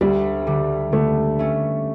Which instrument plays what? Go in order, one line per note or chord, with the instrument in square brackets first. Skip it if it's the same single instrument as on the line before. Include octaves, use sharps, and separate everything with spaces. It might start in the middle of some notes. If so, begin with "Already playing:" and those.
[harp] D2 [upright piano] G3
[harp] D3 G3
[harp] D3 [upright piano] A3
[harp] A3 C#4